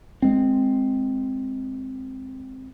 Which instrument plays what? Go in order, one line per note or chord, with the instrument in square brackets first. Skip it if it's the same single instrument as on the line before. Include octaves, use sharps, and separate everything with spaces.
[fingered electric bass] G#3 C4